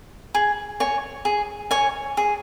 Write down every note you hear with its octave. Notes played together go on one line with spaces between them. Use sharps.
G#4
C#5 G#5
G#4
C#5 G#5
G#4